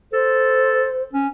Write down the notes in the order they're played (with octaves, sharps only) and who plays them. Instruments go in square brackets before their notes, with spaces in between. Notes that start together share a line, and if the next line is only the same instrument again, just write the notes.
[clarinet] A4 [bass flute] C5
[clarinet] C#4